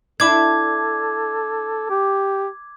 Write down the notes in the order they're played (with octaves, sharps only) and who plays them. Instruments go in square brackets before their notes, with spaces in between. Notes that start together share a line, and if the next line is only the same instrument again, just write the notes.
[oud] D4 E4 [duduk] A4 [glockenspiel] D6 G#6
[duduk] G4